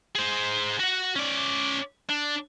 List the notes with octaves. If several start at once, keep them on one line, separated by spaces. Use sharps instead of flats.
G#4 C5
F#4 F#5
C#4 D5
D4